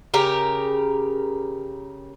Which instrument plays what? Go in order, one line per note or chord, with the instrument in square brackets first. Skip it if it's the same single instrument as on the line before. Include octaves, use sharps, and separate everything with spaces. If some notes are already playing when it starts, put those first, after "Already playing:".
[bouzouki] C#3 G4 A#4